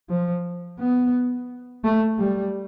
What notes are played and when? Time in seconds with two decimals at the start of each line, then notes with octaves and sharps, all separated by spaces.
0.10 F3
0.79 B3
1.84 A3
2.19 G3